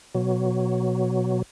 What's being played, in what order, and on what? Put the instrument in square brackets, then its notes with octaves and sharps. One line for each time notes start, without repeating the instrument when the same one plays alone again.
[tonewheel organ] B2 F#3